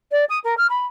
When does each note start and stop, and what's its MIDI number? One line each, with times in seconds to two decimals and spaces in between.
0.12 0.25 74
0.29 0.39 87
0.44 0.54 70
0.57 0.67 89
0.69 0.86 83